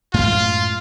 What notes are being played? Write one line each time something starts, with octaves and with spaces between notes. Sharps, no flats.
F#2 A2 G#3 F4